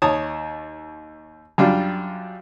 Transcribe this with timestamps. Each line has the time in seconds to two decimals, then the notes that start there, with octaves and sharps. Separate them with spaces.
0.02 D#2 C#5 A5 D#6
1.58 F#2 G3 D4 F4